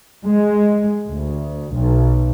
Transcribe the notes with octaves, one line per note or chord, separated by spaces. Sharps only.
G#3
D2
B1